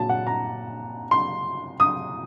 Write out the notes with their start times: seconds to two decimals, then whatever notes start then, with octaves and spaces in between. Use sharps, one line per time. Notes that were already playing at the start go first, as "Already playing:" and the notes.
Already playing: A#2 F#3 A5
0.09 F#5
0.27 A#5
1.11 C6
1.80 D#6